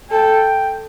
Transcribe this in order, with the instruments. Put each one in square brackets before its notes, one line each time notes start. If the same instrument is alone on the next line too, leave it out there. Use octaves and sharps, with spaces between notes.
[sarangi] A4 [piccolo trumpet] G5